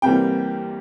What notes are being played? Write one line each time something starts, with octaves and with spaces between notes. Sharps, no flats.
C2 C3 E3 G3 A#3 G5